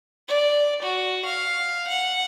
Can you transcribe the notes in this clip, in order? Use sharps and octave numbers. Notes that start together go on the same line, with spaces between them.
D5
F#4
F5
F#5